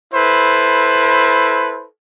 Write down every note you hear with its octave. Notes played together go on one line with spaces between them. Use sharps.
E4 A4 B4 C5